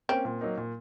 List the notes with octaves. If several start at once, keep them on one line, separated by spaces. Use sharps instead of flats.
A#3 C4 C#4
A#2
F#3 A#3 D#4
A#2